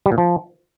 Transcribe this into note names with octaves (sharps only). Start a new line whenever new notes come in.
G3
A#2
F3